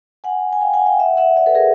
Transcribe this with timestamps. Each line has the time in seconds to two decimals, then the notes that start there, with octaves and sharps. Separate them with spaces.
0.24 F#5 G#5
0.53 G#5
0.61 F5 G5
0.74 F#5 G#5
0.86 F5 G5
0.99 E5 F#5
1.17 E5 F#5
1.36 D5 E5
1.46 A4 B4
1.55 G#4 A#4